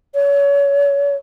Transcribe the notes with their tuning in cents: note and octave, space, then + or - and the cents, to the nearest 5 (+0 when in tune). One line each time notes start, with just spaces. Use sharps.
C#5 +30